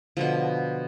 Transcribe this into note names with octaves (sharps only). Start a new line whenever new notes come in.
B2 D3 F3